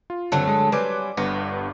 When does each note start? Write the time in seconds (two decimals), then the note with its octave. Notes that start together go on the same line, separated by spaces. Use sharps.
0.10 F4
0.32 G2 D3 F#3 A3 C4
0.48 G#3
0.72 F#3 G3 C4 B4 G#5 D6
1.17 G1 G2 B3 A#6